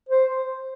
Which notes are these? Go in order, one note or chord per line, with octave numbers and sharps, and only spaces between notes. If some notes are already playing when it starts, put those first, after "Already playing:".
C5